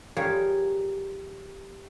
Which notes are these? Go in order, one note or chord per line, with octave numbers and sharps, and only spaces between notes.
F3 G3 A#3 G#4 C5 C#5